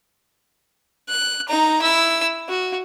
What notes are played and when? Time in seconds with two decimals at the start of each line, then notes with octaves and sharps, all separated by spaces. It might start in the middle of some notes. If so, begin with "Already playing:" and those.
1.09 F#6
1.49 D#4 A#5
1.82 E4 E6
2.49 F#4